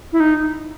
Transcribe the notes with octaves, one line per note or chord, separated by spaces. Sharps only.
E4
D#4